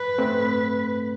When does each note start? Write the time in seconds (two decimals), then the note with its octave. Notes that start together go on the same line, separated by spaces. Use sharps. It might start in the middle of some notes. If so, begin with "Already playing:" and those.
Already playing: B4
0.18 A3 C4